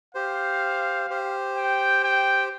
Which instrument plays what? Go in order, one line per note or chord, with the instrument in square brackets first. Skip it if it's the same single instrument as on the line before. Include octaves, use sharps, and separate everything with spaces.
[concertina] G4 C5 [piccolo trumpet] F5
[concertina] G4 C5
[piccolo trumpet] G5
G5